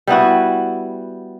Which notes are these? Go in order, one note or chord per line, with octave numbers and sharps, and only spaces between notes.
G3 B3 E4 F#4